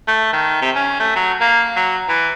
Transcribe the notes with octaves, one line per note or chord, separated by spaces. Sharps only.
A3
D#3
C3
C#4
A3
F#3
A#3
F#3
E3